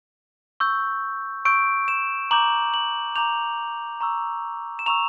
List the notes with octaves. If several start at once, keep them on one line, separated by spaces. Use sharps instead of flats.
C#6 E6 G6
C#6 E6 G6 D7
E7
A#5 D6 G6 F#7
F#7
A#5 D6 G6 F7
A#5 C#6 E6
E7
A#5 C#6 E6 F7